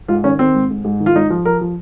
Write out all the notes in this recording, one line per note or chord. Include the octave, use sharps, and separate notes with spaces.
G#2 F4
D#3 C#4
D#3 C4
G#2
G#2
G#2
D#3
F4
G#2 D#4
F3
F3 A#4
F3